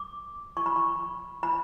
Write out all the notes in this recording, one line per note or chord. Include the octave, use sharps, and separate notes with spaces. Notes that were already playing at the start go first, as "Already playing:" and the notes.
Already playing: D6
C#6
B5
C#6
B5